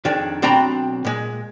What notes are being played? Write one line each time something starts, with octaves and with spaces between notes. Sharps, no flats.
F2 D#3 D4 G#4
B1 C4 D4 G5 A#5 B5
A#2 G#3